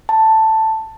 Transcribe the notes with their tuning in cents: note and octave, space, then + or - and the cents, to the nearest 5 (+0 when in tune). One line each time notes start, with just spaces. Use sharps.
A5 +5